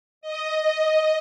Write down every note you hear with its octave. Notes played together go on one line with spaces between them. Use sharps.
D#5